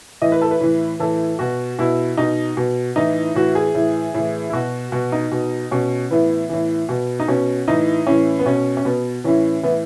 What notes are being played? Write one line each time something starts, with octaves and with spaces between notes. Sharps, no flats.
A2 E3 D#5
B4
A4
B4
A2 E3
A2 E3 A4
B2 F#4
B2 E4
B2 D#4
B2
A2 E3 D#4
A2 E3 F#4
G#4
A2 E3
A2 E3
E4
B2 F#4
B2 F#4
D#4
B2
B2 C#4
A2 E3 B3
A2 E3
B2
D#4
B2 C#4
A2 E3 D#4
A2 E3 C#4
B3
B2 C#4
C#4
B2 B3
A2 E3 C#4
A2 E3 B3